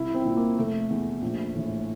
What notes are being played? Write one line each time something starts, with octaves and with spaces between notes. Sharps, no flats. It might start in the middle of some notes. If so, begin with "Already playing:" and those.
Already playing: C2 E4
C4
A#2
A#3
F1 A3
E2 E3
A#1
A2 E3